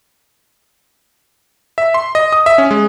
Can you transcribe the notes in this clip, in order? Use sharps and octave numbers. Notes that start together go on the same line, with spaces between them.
E5
C6
D#5
D#6
E5
C#4
G#3